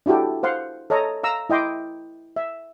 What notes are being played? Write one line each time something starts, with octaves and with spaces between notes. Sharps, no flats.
D4 E4 F#4 G4 A4
C5 F5 F#5 C6
A4 C#5 D#5 A#5
F5 A#5 E6
E4 D#5 G5 C6 D6
E5